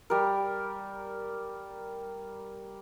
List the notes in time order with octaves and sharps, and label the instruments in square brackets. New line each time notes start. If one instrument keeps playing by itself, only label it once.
[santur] G3 A#4